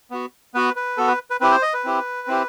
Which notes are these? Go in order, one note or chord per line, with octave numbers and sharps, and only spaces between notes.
B3 F#4
B3 F#4 B4
B4
B3 F#4 A4
B4
B4
C4 E4 G4 B4
C5
D#5
B4
C4 E4 G4
C4 E4 G4